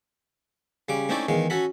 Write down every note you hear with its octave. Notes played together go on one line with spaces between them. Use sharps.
C#3 G3 D6
A3 C4 C#4 D#4 E4 D5
E2 D#3 G#3 F5
C#4 F#4 A4 B5